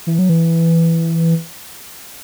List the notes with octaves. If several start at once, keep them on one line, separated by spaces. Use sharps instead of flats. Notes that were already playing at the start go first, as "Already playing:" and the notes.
E3
F#3
E3